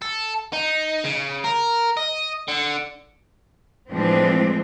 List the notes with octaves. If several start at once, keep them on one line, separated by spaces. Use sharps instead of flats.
A4
D#4
C#3
A#4
D#5
D3
A2 E3 F3 G#3 C4 D4